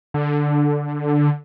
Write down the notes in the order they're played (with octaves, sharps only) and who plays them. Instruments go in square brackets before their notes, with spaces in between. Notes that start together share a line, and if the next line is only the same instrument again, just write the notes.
[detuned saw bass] D3